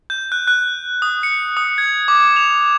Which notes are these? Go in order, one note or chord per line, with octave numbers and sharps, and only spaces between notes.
G6
F#6
F#6
D#6
C#7
D#6
G#6
D6
F7